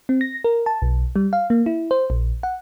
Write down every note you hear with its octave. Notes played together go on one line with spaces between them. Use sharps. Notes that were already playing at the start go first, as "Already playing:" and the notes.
C4
A#6
A#4
A5
B1
G3
F5
A#3
E4
C5
A#1
F#5